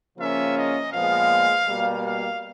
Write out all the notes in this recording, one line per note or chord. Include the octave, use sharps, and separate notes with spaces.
C#3 F3 A#3 C#4 F4 E5
D#5
A#2 F3 G#3 B3 F5
B2 G3 A#3
F5